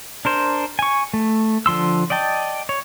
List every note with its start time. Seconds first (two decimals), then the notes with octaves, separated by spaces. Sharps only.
0.25 D4 A#4 C5
0.79 G#5 C#6
1.14 A3
1.66 D3 F3 C6 E6
2.10 D5 D#5 G5 A5
2.69 C#5